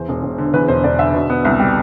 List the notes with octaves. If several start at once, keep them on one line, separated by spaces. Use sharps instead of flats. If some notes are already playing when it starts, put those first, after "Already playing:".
Already playing: E2 C5
E1
E1
D3
E2 B4
E1 C5
E1 D5
D3 E5
B2
B3
C2
G3